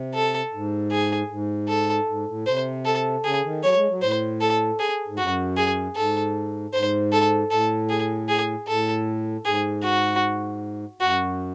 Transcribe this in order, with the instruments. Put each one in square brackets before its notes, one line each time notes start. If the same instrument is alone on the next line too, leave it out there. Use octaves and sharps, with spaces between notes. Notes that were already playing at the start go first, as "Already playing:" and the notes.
Already playing: [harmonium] C3
[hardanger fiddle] A4
[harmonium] G#2
[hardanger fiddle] G#4
[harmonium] G#2
[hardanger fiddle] A4
[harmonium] G#2
A2
[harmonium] C3 [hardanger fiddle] C5
[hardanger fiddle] A4
[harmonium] C#3 [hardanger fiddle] G#4
[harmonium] D#3
[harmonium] F#3 [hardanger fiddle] C#5
[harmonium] G#3
F#3
[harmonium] A2 [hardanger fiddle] C5
[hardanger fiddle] A4
G#4
[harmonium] G#2
[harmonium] F#2 [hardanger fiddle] F#4
[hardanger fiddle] G#4
[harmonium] G#2 [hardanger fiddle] A4
[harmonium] G#2 [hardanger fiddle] C5
[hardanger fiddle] A4
[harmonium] A2 [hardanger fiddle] A4
[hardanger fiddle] G#4
G#4
[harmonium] A2 [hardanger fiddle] A4
[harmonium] G#2 [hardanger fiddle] G#4
[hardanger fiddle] F#4
[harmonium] F#2 [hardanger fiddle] F#4